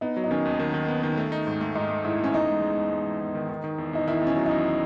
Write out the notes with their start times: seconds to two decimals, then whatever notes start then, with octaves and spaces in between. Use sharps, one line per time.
0.01 B3 D#4
0.17 F#3
0.24 D#4
0.31 D#3 C#4
0.45 D#2
0.60 D#3
0.74 D#3
0.88 B3
1.03 D#3
1.17 A3
1.32 D#4
1.47 G#2
1.61 A3
1.75 G#2 D#4
1.90 A3
2.04 G#2 E4
2.19 A3 C#4
2.34 E2 D#4
2.48 G#3
2.62 G#3
2.77 E2
2.91 G#3
3.07 E2
3.20 E2
3.35 D#3
3.49 D#3
3.64 D#3
3.78 E2
3.93 E2 D#4
4.07 D#3 E4
4.22 E2
4.27 C#4
4.36 F#3
4.46 E2 D#4